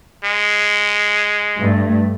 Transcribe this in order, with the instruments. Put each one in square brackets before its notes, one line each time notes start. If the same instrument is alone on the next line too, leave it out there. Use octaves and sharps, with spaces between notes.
[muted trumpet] G#3
[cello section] G2 A3